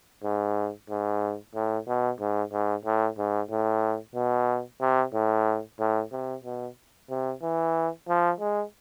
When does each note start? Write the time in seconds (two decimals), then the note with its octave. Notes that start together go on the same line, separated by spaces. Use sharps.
0.24 G#2
0.90 G#2
1.55 A2
1.88 B2
2.20 G#2
2.52 G#2
2.85 A2
3.18 G#2
3.51 A2
4.15 B2
4.81 C3
5.14 A2
5.80 A2
6.12 C3
6.44 B2
7.10 C3
7.43 E3
8.08 F3
8.40 G#3